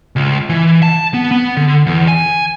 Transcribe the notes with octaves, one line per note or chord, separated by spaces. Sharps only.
C#2
E3
A5
B3
B3
D3
E2
G#5